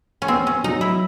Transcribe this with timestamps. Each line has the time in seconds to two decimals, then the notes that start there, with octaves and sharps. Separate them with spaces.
0.22 C#4
0.28 B3 C4
0.47 C#4
0.64 F#3 D#4
0.81 E4